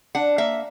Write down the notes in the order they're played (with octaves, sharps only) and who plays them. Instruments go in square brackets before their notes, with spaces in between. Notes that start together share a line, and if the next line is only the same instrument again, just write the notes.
[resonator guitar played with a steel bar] D4 F#5
A#3 E5